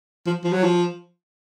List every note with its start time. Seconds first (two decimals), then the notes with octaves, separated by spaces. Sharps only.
0.26 F3
0.44 F3
0.53 F#3
0.64 F3